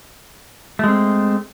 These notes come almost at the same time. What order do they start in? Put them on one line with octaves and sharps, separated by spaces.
A3 G#3 C4